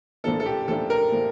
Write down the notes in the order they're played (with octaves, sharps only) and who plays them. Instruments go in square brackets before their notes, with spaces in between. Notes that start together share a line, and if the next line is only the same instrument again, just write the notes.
[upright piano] A#1 A2 F3 A#3 D4 [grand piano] A4
[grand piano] A4
G4
[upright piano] A#1 A2 F3 A#3 D4 [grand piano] A4
[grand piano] A#4
[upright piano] A2 F3 A#3